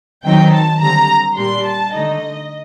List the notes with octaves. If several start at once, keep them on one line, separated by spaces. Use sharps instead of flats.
D#3 F#3 C4 D#4 G5
A5
D3 G3 C4 A#5
A#2 G3 D4 C6
A5
D3 A3 D#4 D#5